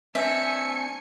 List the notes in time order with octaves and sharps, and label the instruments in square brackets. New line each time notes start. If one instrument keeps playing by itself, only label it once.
[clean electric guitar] C4 D4 [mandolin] E5 [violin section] G#5 C#7